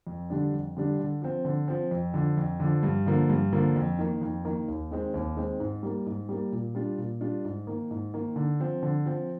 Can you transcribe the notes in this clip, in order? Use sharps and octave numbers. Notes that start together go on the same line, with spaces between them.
F2
D3 G3 D4
F2
D3 G3 D4
D3
F3 C4
D3
F3 C4
F2
D3 F3
F2
D3 F3
G2
D3 F3 A#3
G2
D3 F3 A#3
F2
D#3 A#3
F2
D#3 A#3
D#2
D#3 G#3 C4
D#2
D#3 G#3 C4
G#2
G3 A#3
G#2
G3 A#3
A#2
G3 D4 F4
A#2
G3 D4 F4
G#2
D#3 A#3
G#2
D#3 A#3
D3
F3 C4
D3
F3 C4